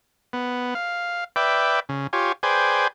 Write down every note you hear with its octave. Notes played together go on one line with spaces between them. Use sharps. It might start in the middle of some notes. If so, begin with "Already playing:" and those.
B3
F5
B4 D5 E5 G5
C#3
F4 G4 C#5 G#5
G#4 B4 C5 D5 G5 G#5